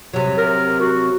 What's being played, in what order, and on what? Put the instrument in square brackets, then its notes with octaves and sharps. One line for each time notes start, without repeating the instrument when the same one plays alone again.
[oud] C3 F#3
[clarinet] A#4
F#4